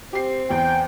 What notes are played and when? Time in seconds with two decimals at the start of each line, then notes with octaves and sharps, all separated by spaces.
0.13 C4 G4 C7
0.50 E2 G5